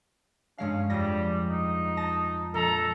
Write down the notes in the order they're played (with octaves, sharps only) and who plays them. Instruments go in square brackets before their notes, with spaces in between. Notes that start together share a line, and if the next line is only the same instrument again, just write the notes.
[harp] G2 G#3 F5 [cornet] C#4
[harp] F2 G#4 A#6 [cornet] G3
[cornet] D#4
[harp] A5 A#6
[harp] A#1 [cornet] A4 [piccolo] A#5